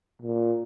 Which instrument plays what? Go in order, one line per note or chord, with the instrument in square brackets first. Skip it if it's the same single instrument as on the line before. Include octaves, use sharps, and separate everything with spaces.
[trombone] A#2